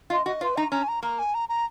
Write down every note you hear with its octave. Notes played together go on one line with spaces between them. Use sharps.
F4 D#5
F#4 D#5
F4 B4
D#4 A#5
C#4 A#5
G#5
A#5
A#3 A#5
G#5
A#5
A#5